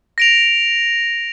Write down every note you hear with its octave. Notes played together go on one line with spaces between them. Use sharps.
A#6 D7 F7